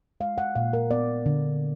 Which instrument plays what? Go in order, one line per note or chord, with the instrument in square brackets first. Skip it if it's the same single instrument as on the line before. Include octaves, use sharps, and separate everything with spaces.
[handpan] G#3 F5
F#5
A#2 F5
A#4
B3 D5
D3